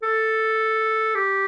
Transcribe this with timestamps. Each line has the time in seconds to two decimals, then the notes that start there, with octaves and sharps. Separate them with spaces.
0.03 A4
1.15 G4